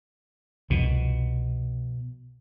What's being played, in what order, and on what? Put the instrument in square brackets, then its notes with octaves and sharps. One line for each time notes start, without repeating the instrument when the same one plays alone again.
[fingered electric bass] C2 F2 [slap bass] B2